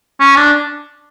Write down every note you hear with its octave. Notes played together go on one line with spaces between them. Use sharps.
C#4
D4